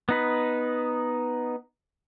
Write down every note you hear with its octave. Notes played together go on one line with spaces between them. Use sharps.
B3 D#4 B4